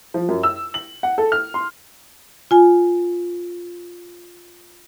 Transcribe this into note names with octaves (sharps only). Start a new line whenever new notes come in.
F3
F#2
E6
F#7
F#5
A4
F6
C6
F4 G#5